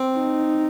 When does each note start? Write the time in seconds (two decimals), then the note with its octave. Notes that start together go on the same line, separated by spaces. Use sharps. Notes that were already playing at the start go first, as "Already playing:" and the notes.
Already playing: C4
0.17 D#4